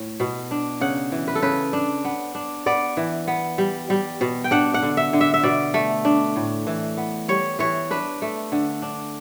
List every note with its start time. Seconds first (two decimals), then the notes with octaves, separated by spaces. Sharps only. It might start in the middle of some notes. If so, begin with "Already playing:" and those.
Already playing: A2
0.20 B2
0.51 D4
0.81 C#3 F#5
1.12 E3
1.28 B4
1.35 A4
1.42 C#3 B4
1.73 D4
2.05 B3
2.35 D4
2.66 B3 D5
2.97 E3
3.27 B3
3.58 G3
3.90 G3
4.21 B2
4.44 G5
4.51 D4 F#5
4.74 F#5
4.83 D3
4.97 E5
5.13 D3
5.21 E5
5.34 E5
5.43 B2 D5
5.74 A3
6.05 D4
6.36 A2
6.67 E3
6.97 B3
7.28 G3 C#5
7.59 E3 C#5
7.90 D4 B4
8.22 A3
8.52 D3
8.82 D4